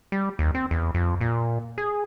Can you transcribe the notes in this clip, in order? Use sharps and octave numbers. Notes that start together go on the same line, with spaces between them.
G3
D#2
C4
E2
F2
A#2
G#4